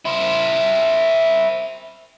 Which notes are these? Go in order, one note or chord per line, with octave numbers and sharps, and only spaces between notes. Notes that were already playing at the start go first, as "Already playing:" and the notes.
E4 C5